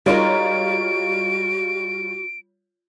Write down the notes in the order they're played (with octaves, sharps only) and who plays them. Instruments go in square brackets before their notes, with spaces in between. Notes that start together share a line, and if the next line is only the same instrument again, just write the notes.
[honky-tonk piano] G3 F4 C#5 [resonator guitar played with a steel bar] G#3 D#4 A#4 [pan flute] F#4 [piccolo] D7